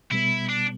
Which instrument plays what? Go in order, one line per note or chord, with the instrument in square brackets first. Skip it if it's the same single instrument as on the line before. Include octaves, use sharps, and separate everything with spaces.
[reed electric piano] B2 G3 B3 [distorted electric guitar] E4
[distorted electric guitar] D4